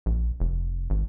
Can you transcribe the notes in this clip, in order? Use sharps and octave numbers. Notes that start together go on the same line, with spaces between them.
A#1
F1
G#1